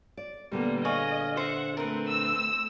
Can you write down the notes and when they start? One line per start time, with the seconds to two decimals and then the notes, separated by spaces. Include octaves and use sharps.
0.17 D5
0.52 A#2 D3 G3 A#3 B3
0.85 G#4 C#5 D#5 F5
1.37 C5 E5 F#5
1.77 A3 C4 A#4 B4
2.08 E6